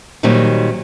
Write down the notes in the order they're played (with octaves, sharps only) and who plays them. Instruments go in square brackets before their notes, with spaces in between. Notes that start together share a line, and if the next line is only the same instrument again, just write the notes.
[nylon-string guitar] A#2 D#3 F#3 G3 C4